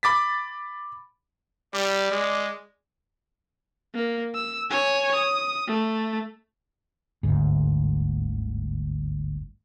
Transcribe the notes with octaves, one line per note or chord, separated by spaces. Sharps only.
B5 D6 A6 B6
G3 D5
G#3
A#3
E6
C#5 G#5
D#6
A3
G1 D2 G#2